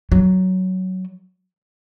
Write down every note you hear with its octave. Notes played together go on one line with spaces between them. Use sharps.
F#3